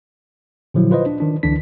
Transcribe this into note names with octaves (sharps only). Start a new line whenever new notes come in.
A#2 D3 F3 F#3 E4
F4 B4 C5 D#5
D4
D#3 D4
C#2 D3 E3 D4 B6